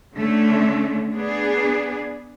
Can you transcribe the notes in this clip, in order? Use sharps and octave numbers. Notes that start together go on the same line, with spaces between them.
D3 A3 C#4
B3 D4 G#4 D5